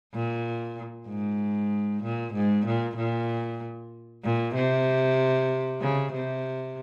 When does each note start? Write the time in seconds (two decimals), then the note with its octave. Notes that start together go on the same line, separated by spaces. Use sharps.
0.14 A#2
1.08 G#2
2.03 A#2
2.34 G#2
2.66 A#2
2.97 A#2
4.24 A#2
4.55 C3
5.81 C#3
6.13 C3